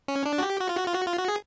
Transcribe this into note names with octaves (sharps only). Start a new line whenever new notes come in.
C#4
D4
F#4
G4
F#4
F4
F#4
F4
F#4
F4
F#4
G#4